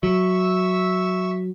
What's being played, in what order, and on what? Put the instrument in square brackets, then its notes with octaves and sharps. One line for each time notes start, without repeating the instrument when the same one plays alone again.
[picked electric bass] F#3 [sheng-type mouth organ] E5 C#6 E6